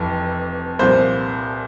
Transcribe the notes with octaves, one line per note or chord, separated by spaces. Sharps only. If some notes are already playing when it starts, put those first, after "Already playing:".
Already playing: F1 F2 E3
C2 A#2 F3 C5